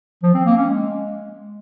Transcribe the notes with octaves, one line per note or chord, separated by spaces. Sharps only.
F3
C4
A#3
C#4
G#3